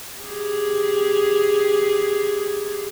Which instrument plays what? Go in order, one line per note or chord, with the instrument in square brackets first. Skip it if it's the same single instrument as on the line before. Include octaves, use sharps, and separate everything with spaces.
[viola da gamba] G4 G#4